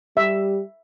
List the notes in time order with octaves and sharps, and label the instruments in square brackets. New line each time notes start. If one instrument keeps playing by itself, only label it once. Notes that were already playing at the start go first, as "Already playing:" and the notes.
[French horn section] G3 G4 [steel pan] E5